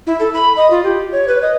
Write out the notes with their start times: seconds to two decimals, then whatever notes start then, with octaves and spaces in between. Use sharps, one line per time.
0.07 E4
0.20 A4
0.34 B5
0.57 D#5
0.70 F4
0.84 G4
1.12 C#5
1.28 B4
1.42 D#5